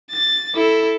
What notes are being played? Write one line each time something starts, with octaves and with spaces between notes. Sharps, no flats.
A6
E4 A4